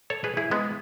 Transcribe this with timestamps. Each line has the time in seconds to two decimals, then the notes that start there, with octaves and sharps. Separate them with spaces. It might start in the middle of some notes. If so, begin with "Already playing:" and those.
0.10 A4 C#5
0.24 G#4 B4
0.37 E4 G#4
0.51 G#3 B3